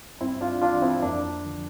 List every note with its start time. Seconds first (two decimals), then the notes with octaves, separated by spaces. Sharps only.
0.21 G2 C4 E4
0.41 D4 F4
0.62 E3 D4 F4
0.82 C4 E4
1.03 F2 A#3 D4
1.44 D3 F3